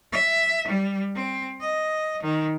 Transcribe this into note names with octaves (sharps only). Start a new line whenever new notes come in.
E5
G3
C4
D#5
D#3